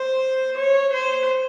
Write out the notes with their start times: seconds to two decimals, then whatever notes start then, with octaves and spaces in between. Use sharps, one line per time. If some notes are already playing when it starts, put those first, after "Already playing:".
Already playing: C5
0.57 C#5
0.93 C5